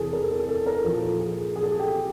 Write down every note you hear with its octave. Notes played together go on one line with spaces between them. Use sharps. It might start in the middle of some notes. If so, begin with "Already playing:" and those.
Already playing: E2 C3 E3 G#4 A4
A#4
A4
A#4
A4
A#4
A#2 F3 A4
G#4
G#4
A4
G#4
G4